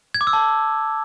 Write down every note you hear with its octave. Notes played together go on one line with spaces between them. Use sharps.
G#6
D6
E6
A5